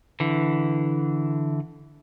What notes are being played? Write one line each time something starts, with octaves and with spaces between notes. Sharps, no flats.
D3 E3